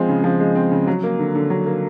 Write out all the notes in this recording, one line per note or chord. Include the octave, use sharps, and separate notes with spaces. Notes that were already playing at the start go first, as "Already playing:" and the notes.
Already playing: F3 G#3 C4
C#3
F3
G#3
C4
C#3
F#3
A#3
D3
D3
F#3
A#3